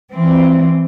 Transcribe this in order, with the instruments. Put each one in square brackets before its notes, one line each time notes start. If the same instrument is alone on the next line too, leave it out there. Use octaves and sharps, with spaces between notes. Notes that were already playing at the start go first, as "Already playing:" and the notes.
[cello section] E3 C4